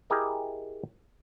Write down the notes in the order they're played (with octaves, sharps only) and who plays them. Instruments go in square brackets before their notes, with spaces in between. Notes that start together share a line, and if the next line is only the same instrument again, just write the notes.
[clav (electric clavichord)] E4 G4 G#4 A#4 D#5